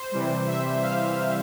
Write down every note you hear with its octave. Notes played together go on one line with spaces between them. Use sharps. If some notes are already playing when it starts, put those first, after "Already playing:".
Already playing: C5
C3 E3 G3
E5
F5